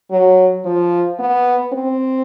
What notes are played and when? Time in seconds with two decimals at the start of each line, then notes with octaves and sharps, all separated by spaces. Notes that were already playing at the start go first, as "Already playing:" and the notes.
0.11 F#3
0.65 F3
1.19 B3
1.73 C4